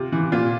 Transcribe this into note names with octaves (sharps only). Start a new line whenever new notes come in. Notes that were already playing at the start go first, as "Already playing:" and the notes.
Already playing: C3 F4
E3
A#2 F4